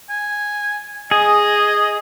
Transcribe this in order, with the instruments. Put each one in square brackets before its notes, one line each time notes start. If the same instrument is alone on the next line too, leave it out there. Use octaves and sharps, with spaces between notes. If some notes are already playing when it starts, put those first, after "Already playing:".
[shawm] G#5
[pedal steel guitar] G#4 [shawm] D#5